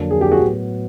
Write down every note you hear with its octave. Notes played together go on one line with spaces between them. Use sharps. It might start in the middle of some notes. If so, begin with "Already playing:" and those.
Already playing: F2 D3 F#3 A#3 D4
G#4
G4
F#4 G#4
A2 F#3 B3